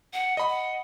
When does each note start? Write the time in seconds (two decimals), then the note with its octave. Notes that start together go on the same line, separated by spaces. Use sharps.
0.13 F#5
0.37 D#5 B5
0.49 F#5